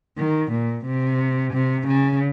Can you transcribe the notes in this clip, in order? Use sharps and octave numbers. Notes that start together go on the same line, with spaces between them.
D#3
A#2
C3
C3
C#3